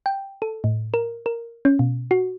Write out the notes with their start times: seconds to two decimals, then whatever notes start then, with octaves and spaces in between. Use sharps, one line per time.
0.06 G5
0.42 A4
0.64 A2
0.94 A#4
1.26 A#4
1.65 C#4
1.79 B2
2.11 F#4